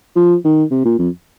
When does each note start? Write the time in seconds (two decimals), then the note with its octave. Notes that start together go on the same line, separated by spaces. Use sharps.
0.16 F3
0.44 D#3
0.71 C3
0.85 A#2
0.99 F2